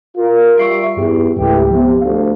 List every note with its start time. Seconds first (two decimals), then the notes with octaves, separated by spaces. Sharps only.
0.17 F4 A#4
0.57 G3 E5 C#6 C7 D7
0.96 E2 G2 G4
1.36 C#2 G#2 E3 A3 G4
1.71 C3 F3 B3
2.01 D2 F#4 F5